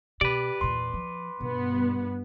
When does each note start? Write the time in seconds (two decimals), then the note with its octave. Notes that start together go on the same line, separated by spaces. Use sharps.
0.21 B2 G4 B4 D5
0.61 E2 A#2 C6
0.94 F3
1.41 G2 B2 B3